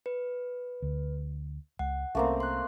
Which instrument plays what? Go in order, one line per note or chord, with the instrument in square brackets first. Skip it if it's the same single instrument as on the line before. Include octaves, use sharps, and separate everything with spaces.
[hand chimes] B4
[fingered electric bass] D2
[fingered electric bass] C#2 [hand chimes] F#5
[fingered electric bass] C2 C#4 [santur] A3 A#3 C4
[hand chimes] C6 F#6